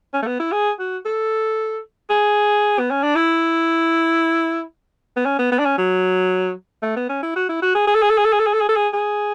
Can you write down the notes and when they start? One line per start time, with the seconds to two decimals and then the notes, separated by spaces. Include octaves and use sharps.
0.13 C#4
0.22 A3
0.26 B3
0.40 E4
0.52 G#4
0.79 F#4
1.05 A4
2.10 G#4
2.79 B3
2.91 C#4
3.03 D4
3.15 E4
5.16 B3
5.25 C#4
5.39 B3
5.52 B3
5.59 D4
5.65 C#4
5.78 F#3
6.82 A3
6.96 B3
7.09 C#4
7.23 E4
7.36 F#4
7.49 E4
7.62 F#4
7.75 G#4
7.87 G#4
7.95 A4
8.02 G#4
8.10 A4
8.18 G#4
8.25 A4
8.33 G#4
8.39 A4
8.46 G#4
8.53 A4
8.61 G#4
8.69 A4
8.76 G#4
8.93 G#4